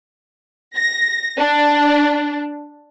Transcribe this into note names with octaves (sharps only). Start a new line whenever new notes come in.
A#6
D4